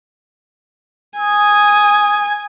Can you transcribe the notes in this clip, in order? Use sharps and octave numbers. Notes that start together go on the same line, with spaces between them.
G#5 D#6